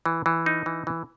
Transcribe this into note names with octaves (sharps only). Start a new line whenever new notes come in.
E3
E3
D#4
E3
E3